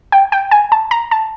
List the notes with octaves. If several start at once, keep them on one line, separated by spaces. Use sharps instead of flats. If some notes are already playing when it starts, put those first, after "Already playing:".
G5
G5
G#5
A5
A#5
A5